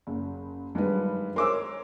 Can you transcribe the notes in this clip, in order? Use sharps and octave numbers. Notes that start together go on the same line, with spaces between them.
F#1
G2 D#3 F#3 G#3 B4
A#4 C5 C#5 C6 D6 E6